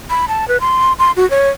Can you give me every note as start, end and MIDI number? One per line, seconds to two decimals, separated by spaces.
0.10 0.25 83
0.28 0.48 81
0.48 0.58 71
0.61 0.93 84
0.99 1.11 84
1.17 1.28 66
1.30 1.49 73